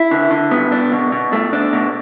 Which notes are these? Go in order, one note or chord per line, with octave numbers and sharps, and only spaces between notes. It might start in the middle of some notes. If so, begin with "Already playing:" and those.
Already playing: E4
D3
D3
B3
D4
B2
B2
A3
D4
B2